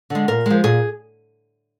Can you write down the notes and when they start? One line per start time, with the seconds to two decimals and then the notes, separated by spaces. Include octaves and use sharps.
0.10 D3 G#3
0.28 A#2 A#4
0.46 F3 G#3
0.64 A#2 G#4